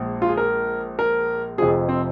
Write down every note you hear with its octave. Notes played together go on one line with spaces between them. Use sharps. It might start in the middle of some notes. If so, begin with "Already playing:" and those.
Already playing: A#1 A#2 G#3
F4
G#4
A#4
A#4
F1 F2 F3 G#4
C4